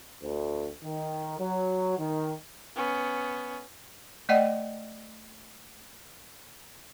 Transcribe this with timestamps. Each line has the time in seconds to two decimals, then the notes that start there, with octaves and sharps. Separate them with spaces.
0.22 D2
0.84 D#3
1.40 F#3
1.99 D#3
2.76 B3 C#4
4.29 A3 D5 D#5 F#5 G5